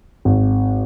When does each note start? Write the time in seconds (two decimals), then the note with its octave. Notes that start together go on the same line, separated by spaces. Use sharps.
0.25 G#1